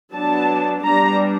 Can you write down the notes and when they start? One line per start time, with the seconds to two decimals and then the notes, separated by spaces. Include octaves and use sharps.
0.13 F#3 B3 D4 A5
0.84 G3 B3 D4 A#5